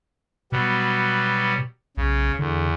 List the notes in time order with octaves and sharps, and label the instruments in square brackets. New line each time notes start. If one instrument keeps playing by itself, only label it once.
[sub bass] B2 [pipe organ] F#3 G3 B3
[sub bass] B1 [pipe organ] C#3
[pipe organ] E2 [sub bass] D3